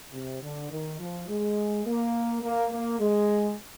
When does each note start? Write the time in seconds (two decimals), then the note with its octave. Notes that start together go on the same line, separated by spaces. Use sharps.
0.13 C3
0.42 D3
0.71 D#3
0.99 F3
1.28 G#3
1.85 A#3
2.42 A#3
2.71 A#3
3.00 G#3